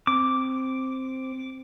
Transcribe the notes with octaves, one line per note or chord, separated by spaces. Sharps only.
C4 D6